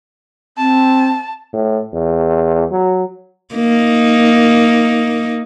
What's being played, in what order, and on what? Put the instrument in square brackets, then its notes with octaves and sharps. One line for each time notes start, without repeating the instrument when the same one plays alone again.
[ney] C4 [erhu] A5
[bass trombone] A2
E2
F#3
[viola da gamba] A#3 D#4